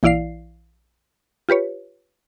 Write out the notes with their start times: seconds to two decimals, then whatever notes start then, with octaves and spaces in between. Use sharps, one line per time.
0.03 A#1 E3 E4 D5 F5 C7
1.49 F4 G4 B4 C#5